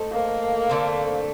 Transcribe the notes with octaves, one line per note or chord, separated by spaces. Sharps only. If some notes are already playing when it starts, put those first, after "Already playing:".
Already playing: A3 D#4 A4 C5
A#3
D3 A3 C4